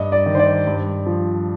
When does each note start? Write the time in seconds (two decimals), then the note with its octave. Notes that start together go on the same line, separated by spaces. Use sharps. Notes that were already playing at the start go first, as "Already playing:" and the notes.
Already playing: G2 D#5
0.12 D5
0.26 D#3
0.35 C5
0.39 D5
0.67 G2
1.06 F3